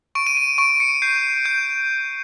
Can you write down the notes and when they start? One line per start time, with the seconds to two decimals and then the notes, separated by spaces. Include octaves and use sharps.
0.15 C#6 D7
0.27 D#7
0.37 D7
0.58 C#6 D7
0.80 C#7
1.02 G6 C7
1.46 G6